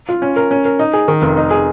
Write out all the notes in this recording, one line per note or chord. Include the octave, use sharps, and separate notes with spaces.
F4
C#4
A#4
C#4
A#4
D#4
G#4
D#3
F1
D#4
G#4